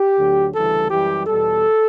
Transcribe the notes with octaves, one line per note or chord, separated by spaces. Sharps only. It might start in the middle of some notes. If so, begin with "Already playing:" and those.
Already playing: G4
D2 D3 F#3
D2 C#3 E3 G3 A4
F#2 E3 G3 G4
E2 B2 G3 A4